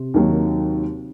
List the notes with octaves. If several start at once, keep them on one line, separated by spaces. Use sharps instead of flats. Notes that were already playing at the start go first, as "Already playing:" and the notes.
Already playing: C3
D#2 D#3 F#3 A#3